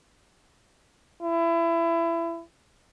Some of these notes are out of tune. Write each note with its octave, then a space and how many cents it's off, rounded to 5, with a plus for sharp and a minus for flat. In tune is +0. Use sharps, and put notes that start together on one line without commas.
E4 +25